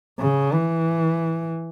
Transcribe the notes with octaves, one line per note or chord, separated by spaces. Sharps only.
C#3
E3